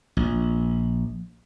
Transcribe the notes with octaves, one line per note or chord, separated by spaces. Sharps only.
A#1